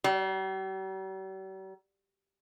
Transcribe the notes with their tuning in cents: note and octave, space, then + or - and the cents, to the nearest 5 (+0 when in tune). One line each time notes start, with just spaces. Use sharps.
G3 -45